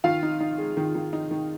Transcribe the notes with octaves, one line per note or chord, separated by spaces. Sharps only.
D#3 F4 F5
D#4
D#4
G#3
D#3
D#3
D#4
D#3